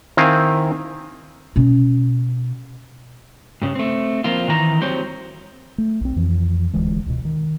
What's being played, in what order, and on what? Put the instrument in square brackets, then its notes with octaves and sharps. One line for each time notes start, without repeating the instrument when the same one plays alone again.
[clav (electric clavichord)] D#3 C4 E4 F5 G#5
[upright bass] B2 C#4
[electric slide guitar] G2 C#3
A3 C4
F3 A#3 C4 F4
D#3 E3 A#5
F#3 G3 C4 C5 C#5
[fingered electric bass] A3
B1 C4
F2 E3 F3
D#1 D2 E3 G#3
C#2 B2
D#3